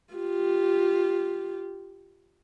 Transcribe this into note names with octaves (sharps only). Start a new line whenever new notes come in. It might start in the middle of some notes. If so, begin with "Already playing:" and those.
F4 G4